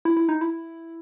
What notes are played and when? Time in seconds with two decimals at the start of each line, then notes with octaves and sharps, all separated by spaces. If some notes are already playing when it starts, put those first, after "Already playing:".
0.05 E4
0.17 E4
0.29 D#4
0.41 E4